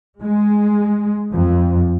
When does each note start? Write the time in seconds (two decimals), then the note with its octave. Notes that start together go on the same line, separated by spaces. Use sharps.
0.22 G#3
1.33 F2